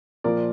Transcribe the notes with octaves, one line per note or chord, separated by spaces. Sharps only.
A#2 F3 A#3 A#4 D5